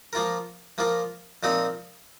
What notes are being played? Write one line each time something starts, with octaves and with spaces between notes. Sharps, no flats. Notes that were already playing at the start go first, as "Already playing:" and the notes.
F3 A#3 F4 A#4
F3 A#3 F4 A#4
A#2 F3 C4 D#4 A#4